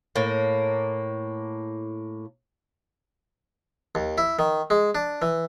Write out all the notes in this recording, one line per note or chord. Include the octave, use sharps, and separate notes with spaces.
A2 A#3
D#2
E4
D#3
G#3
D4
E3